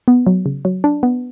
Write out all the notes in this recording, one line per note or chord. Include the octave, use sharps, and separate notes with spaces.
B3
F#3
C#3
F#3
D4
B3